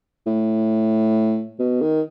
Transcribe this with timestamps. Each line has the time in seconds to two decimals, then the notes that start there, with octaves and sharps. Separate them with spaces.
0.26 A2
1.59 B2
1.81 D#3